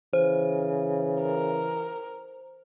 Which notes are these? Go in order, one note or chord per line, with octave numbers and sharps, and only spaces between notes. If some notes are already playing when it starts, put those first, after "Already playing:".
C#3 E3 C5
A#4